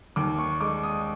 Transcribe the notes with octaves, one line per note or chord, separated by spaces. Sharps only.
D#2 D6
C#6
G#3 D6
D#6